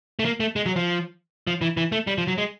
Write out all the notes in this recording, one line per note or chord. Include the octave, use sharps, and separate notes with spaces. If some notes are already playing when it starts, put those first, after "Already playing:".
A3
A#3
A3
G#3
F#3
F3
F3
E3
E3
A3
G3
F3
F#3
G#3